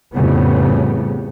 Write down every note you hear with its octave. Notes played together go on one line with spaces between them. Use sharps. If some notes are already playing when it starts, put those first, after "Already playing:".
F2 A2 C#3 G3 B3